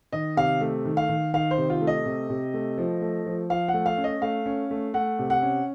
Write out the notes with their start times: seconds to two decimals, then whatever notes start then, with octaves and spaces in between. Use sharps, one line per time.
0.12 D#3 D#5
0.37 C3 F5
0.61 A3
0.85 D#3
0.97 F5
1.09 D#3
1.34 D#3 F5
1.51 C5
1.58 C3
1.70 F4
1.81 A3
1.87 D#5
2.05 C3
2.30 C3
2.54 A3
2.78 F3
3.02 A3
3.26 F3
3.50 F3 F5
3.68 F#5
3.74 A3
3.86 F5
3.97 C#4
4.04 D#5
4.22 A3 F5
4.46 C#4
4.71 A3
4.94 A3 F#5
5.19 C3
5.30 F#5
5.42 C#4